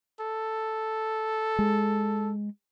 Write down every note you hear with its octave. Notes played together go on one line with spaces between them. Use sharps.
A4
G#3